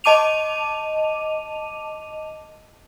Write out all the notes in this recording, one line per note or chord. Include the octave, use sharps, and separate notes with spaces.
D#5 A5 D6 D#7 F7